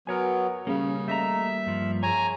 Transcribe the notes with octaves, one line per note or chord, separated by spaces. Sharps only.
F#3 B3 A#4 C#5 G#5
C#3 G3 A#3 C#4
A3 D#5 E5 A#5
G2 F3
G#4 C#5 G#5 A#5